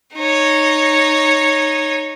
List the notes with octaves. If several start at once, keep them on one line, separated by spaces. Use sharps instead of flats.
D#4 C#5